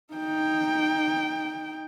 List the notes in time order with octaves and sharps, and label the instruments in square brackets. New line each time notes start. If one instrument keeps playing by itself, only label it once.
[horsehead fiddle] D#4 G5